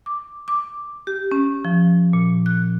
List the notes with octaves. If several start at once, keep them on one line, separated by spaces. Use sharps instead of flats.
D6
D6
G4
C#4
F3
A#2
F#6